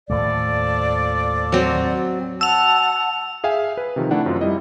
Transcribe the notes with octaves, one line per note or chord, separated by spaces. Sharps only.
D#2 A2 F3 G#3 A4 D5
F#3 C4
F#5 A5 E6 F7
G#4 E5 F5 G5 G#5
B4
C3 D#3 F3
A3 D4 E4 F#5
F#2 F#3 C4 F4
G3 E4 D#5